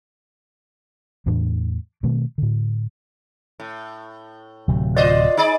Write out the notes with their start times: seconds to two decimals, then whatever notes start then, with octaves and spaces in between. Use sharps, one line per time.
1.26 E2 A2 E3 D4
2.03 B2 D#3 A3 C4
2.38 A2 D3
3.60 A2
4.68 D1 C3 F#3
4.97 F4 C5 D5 D#5
5.37 D#4 G#4 D5